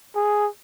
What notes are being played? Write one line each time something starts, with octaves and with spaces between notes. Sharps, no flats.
G#4